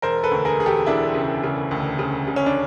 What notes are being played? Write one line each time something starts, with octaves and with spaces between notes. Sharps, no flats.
E1 A#4 C5
A4 B4
D2
G#4 A#4
E1 G#4
G4 A4
E1 D4 E4
C#3
C#3
D2
C#3
C#3
C#4
D4